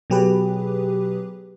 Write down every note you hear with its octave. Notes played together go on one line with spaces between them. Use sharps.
B2 F#3 G4 G#4 B4